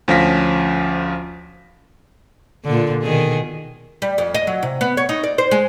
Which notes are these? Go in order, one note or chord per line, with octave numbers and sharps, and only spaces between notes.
D2 F3 C#4 F5 A#6 B6
A#2 D3
B2 D#3 G#4
G3
F2
D#5
F#3
C3
B3
C#5
D#4
D5
C5
G#3